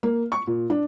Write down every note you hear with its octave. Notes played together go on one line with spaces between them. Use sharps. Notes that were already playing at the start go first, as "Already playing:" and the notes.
A#3
C#6
A#2
D4